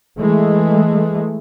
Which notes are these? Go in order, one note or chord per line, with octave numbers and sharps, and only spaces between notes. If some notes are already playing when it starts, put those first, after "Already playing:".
E3 G#3 A3